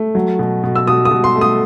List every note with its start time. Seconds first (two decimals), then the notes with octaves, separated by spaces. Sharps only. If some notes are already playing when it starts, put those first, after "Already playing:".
Already playing: A3
0.15 F#3
0.39 B2
0.63 B2
0.76 E6
0.87 B2 D#6
1.05 D#6
1.11 B2
1.24 C6
1.36 A3
1.41 D#6